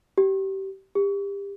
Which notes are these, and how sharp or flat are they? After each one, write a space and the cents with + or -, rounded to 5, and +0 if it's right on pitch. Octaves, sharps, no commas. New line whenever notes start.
G4 -25
G4 +30